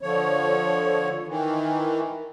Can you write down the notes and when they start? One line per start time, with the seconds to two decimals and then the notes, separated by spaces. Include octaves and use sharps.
0.01 D3 F3 C#5
1.28 D#3 E3